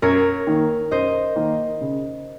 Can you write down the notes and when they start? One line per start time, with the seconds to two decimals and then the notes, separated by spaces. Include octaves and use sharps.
0.02 F#2 A#4 C#5
0.47 D#3 A#3 D#4
0.91 F#2 C5 D#5
1.36 D#3 A#3 D#4
1.81 C#3